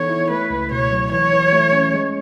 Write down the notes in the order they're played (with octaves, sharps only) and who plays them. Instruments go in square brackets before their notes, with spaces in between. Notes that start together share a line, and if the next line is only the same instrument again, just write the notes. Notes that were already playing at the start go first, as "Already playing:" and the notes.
Already playing: [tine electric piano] E3 B3 D#4 A4 [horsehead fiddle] C#5
[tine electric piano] E4
[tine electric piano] A3 [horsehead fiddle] B4
[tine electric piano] C#2
[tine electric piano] B2 [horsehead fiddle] C#5
[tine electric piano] F#3
[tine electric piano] E3 [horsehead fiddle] C#5
[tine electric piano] E3
A3
C#4
G#3